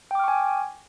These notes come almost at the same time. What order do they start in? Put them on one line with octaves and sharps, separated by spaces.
G5 D6 F6 C#6 G#5